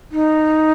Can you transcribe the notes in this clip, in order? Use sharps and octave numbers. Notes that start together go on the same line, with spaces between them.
D#4